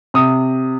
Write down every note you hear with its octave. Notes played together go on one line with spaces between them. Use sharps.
C3 D#6